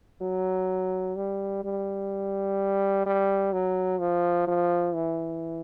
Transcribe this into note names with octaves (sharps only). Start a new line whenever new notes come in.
F#3
G3
G3
G3
F#3
F3
F3
E3